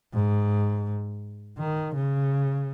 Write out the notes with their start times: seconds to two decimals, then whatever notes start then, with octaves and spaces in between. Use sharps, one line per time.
0.14 G#2
1.58 D#3
1.95 C#3